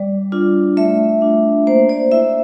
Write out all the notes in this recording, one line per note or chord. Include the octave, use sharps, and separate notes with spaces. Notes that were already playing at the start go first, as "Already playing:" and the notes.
Already playing: G3 D5
D4 F4
A3 E5
D4 F4
A#3 C5
D5
E4 E5